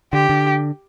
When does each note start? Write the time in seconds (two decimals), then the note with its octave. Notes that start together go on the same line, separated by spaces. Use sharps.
0.13 D3 G4
0.30 D3